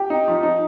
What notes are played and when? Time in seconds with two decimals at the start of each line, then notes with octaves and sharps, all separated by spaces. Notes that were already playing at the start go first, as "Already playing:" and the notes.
Already playing: G4
0.10 D#4
0.28 F3
0.43 D#4